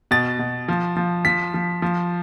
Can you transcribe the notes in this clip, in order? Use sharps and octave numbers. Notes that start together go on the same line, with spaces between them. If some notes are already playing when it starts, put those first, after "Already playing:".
B2 A6
B2
F3
F3
F3 B6
F3
F3